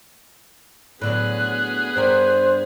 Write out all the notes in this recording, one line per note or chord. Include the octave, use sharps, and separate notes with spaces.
A2 D3 F#3 B3 G#4 F#6
G2 G3 A#4 C5